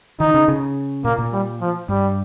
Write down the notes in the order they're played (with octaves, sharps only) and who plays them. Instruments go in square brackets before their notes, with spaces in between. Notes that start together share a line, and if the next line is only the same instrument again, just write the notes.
[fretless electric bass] D#3 [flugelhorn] D#4
[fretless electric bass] C#3
C#3
[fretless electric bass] A#2 [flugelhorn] A#3
[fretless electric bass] A#2
[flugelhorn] G3
F3
[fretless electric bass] G2 [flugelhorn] G3